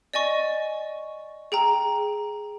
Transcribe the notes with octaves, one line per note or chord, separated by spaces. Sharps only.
D5 D#5 G#5 C#6
G#4 G5 A#5